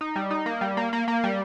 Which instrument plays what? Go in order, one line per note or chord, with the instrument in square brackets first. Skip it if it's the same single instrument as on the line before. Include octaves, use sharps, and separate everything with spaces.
[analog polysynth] D#4
G3
D#4
A#3
G3
A#3
A#3
A#3
G3